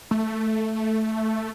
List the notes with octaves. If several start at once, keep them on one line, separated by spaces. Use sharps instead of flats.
A3